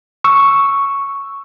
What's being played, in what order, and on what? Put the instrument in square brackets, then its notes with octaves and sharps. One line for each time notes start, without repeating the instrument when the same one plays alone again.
[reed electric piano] C#6 E6